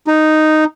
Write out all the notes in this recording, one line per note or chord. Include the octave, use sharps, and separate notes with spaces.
D#4